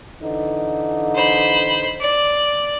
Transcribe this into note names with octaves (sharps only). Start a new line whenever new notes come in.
D3 E3 D#4
C5 B5
D5